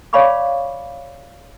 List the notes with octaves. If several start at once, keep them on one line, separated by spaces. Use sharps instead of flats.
C#5 D5 F5 B5 C#6 D6